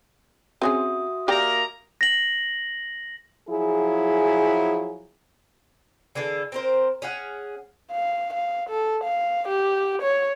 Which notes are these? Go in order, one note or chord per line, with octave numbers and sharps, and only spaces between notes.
C4 C#4 F#4 G#4 E5 D#6
A#3 G4 A#4 D5 G5 A#5
A#6 F#7
F3 F#3 E4 G#4
D3 E3 G#4 A4
C4 A#4 C5
C#4 G#4 F#5
F5
F5
A4
F5
G4
C#5